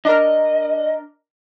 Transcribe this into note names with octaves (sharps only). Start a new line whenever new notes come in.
D4 A#4 D#5